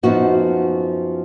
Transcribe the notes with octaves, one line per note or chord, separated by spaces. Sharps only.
F#2 F3 B3 D#4 F#4